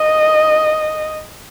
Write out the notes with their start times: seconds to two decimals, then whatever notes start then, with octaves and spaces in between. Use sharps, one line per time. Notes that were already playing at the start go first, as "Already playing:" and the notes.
Already playing: D#5